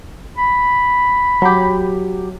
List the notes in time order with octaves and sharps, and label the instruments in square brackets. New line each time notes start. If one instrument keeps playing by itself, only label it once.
[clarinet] B5
[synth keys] F#3 G4